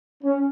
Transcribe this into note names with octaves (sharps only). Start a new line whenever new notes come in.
C#4